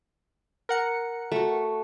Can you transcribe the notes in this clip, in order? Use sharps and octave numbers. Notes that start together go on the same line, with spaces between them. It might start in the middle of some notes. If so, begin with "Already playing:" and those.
A#4 F#5 C#7
A3 F#4